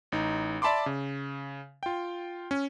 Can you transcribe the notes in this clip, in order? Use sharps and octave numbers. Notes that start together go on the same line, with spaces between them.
A1 D#4
D5 E5 A5 B5 C6 D6
C#3
F4 G5
C#4